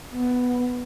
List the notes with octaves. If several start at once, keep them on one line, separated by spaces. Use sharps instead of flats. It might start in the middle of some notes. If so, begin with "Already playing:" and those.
B3